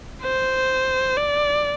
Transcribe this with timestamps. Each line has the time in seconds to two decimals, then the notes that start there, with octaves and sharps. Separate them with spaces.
0.22 C5
1.17 D5